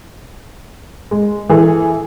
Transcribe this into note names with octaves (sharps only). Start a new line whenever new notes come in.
G#3
E3 G#4 A4